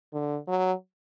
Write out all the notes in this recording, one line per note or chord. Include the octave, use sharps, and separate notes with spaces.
D3
F#3